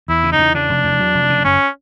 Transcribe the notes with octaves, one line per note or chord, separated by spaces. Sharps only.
E2 E4
C#3
D#4
E2
C#3 D4
F1
E2
F#3
F1
C#3
F#1 C#4